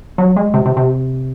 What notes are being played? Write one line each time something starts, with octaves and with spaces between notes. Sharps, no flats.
F#3
G#3
C3
C3
C3